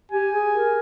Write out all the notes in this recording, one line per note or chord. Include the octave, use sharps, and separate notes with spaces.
G4 G#5
G#4
A#4